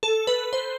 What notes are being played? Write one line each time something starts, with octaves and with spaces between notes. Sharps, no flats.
A4
B4
C5